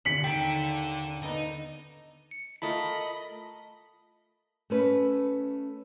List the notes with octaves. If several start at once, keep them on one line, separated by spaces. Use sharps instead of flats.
D#2 D3 B6 C#7 F#7
D4 A4 G5 A#5 A6 D7
B3 D4 D#4 A4
C#7
A3 F4 A#4 D#5 B5
A3 C#4 B4